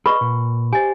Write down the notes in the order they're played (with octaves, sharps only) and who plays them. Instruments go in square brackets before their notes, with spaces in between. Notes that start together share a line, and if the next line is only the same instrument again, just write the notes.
[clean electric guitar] G#4 D5 D#5 [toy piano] B4 C#6 [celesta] B5
[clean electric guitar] A#2
[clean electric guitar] G4 C5 [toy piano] D#5 G#5